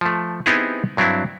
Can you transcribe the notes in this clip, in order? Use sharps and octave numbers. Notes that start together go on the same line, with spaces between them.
F3 A3
B3 C4 D#4 E4 G4 G#4
G2 F#3 C4 D4 E4